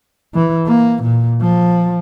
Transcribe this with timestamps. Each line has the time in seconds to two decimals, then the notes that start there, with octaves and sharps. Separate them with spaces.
0.34 E3
0.67 A#3
1.03 A#2
1.41 F3